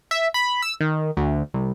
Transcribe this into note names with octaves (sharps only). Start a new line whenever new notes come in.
E5
B5
E6
D#3
D2
C2